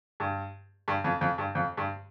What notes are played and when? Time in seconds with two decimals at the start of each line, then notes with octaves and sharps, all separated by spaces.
0.20 G2
0.88 G2
1.04 F2
1.21 F2
1.38 G2
1.55 F2
1.77 G2